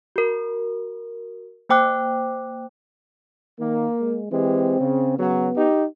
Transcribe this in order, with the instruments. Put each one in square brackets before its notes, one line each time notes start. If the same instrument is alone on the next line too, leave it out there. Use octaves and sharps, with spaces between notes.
[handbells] F#4 A#4
A#3 C5 G5 D6 F#6
[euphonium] D#3 [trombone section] A#3
[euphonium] G#3
[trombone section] E3 G#3 G4 [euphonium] C4
[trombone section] C#3
[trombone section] C#3 F#3 [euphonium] B3
[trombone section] D#4 G4